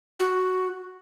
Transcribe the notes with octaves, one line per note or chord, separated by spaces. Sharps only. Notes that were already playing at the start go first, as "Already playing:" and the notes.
F#4